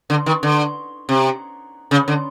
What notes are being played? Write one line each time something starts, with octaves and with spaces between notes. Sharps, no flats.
D3
D#3
D3
C3
C#3
D3